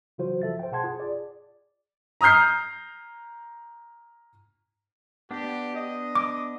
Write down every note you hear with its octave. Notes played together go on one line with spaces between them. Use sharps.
C#3 E3 F#3 F4 F#4 C5
F3 A4 E5 A6
C5 G5
B2 G#4 F#5 A5 C6 G#6
F4 G#4
D5
A#5 D#6 F6 G6 C7
B3 D4 G4
D#5
D6